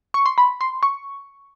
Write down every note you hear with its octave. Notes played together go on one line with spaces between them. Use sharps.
C#6
C6
B5
C6
C#6